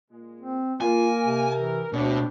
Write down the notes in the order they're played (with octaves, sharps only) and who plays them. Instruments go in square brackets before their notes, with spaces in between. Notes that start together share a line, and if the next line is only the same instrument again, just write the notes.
[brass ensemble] A#2 G#3
[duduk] C4
[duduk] A#3 [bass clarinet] F4 [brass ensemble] A#4 [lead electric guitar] G#5
[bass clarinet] C3
[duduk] E3
[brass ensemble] F#1 G4 C#5 [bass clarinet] D2 [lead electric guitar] B2 [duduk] D4